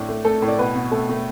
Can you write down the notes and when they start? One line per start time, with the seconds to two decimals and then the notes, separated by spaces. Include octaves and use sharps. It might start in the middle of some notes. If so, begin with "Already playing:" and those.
Already playing: A2 D4
0.09 A3
0.25 A3 A4
0.42 A2
0.48 D5
0.59 B2 B4
0.75 B2
0.91 A3 A4
1.09 A3